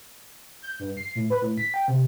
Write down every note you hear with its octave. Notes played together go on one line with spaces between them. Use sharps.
G6
G2
C7
A2
B4
A2
B6
G5
C3